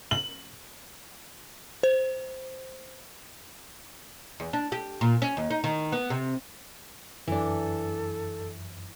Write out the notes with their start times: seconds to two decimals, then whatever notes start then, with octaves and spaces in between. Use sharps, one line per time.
0.11 F#7
1.83 C5
4.40 E2
4.53 D4
4.72 G4
5.01 A#2
5.22 C#4
5.37 D#2
5.50 D#4
5.64 D#3
5.92 B3
6.10 C3
7.28 F#2 E3 D4 A4